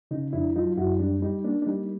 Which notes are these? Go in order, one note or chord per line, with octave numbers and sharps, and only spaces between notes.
C#3 D#4
F2 D4 E4
F#3 D#4 F4
F#2 E4 F#4
G3 D4
G3 D#4
A#3 D4
D4
G3 D#4